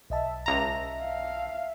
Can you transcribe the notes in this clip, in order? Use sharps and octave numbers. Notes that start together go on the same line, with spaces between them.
B1 D#5 E5 A5
C#2 E5 A#5
F5